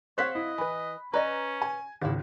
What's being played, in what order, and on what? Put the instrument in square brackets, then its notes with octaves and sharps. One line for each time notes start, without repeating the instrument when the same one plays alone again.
[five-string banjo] C4 F5 F#5 [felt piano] C5 F#6 B6 [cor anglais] C#5
[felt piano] E4 [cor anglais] D#5
[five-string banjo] E3 B4 [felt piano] B5
[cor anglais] C#4 [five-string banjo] B4 D5 D#5 [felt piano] A#5
[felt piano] G#5
[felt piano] G#1 C#2 [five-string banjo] E4 F5 F#5